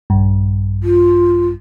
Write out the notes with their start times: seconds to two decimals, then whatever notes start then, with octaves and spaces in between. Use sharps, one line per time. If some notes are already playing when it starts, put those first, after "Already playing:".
0.10 A#1 G2
0.83 F4